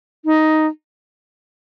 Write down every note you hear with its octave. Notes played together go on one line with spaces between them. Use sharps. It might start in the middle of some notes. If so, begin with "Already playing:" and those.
D#4